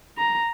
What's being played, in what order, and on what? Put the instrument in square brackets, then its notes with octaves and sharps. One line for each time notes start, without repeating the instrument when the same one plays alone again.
[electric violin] A#5